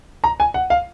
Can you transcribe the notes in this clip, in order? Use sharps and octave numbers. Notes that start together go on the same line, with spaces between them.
A#5
G#5
F#5
F5